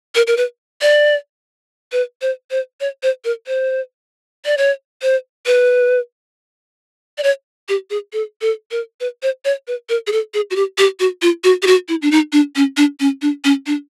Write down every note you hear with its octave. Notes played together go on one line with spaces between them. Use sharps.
A#4
A#4
B4
D5
B4
C5
C5
C#5
C5
A#4
C5
D5
C#5
C5
B4
D5
C#5
G4
G#4
A4
A4
A#4
B4
C5
C#5
B4
A#4
G#4
A4
G#4
F#4
G4
G4
F#4
F4
F#4
G4
F#4
E4
D4
D#4
D4
C#4
D4
C#4
D4
C#4
D4